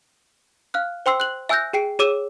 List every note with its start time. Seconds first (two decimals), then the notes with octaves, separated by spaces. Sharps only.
0.74 F5 F6 F#6
1.06 C5 G5 C6 E6 C7
1.20 F#6 F#7
1.49 E5 G#5 E6 F#6 G6 A#6
1.73 G#4 G5 C7 D7
1.99 G#4 C#5 D6 E6 D#7 E7